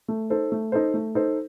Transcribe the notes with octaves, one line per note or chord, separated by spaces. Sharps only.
A3
D#4 A4 C5
A3
D#4 A4 C5
A3
D#4 A4 C5